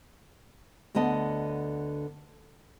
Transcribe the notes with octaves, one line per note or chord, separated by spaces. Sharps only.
D2 D3 B3 D#5 A5